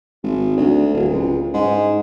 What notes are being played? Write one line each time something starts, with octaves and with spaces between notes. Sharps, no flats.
G#1
D2
D1
C#2
G#2